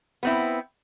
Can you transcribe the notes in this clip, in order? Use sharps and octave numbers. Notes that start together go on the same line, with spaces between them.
B3 C4 E4